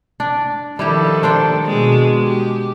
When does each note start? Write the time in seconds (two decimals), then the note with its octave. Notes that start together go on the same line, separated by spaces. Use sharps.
0.20 D4 D5
0.79 D#3 F3 G3 E4 G4 A4
1.23 D4 C5 G5
1.66 B2 G#3
2.22 G4